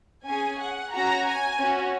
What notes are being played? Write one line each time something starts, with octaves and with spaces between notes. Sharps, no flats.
C#4 G#4 G#5
F#5
C#4 F#4 A#5
G#5
C#4 F#4